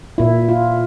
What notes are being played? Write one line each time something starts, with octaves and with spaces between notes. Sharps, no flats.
A#2 E4
F4